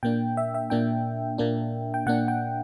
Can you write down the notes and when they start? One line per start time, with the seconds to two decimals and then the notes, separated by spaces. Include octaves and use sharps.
0.03 A#2 A#3 D4 G5
0.37 E5
0.54 E5
0.70 A#2 A#3 D4 G5
1.38 A#2 A#3 D4
1.94 G5
2.06 A#2 A#3 D4 F#5
2.28 G5